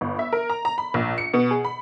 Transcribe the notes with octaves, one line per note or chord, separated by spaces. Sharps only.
G1
E5
A#4
A#5
A#5
B5
A#1
C#7
B2
G#4
B5